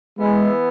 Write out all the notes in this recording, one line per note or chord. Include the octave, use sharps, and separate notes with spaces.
E3 G#3 B3 E4